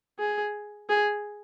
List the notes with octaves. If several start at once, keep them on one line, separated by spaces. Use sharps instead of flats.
G#4
G#4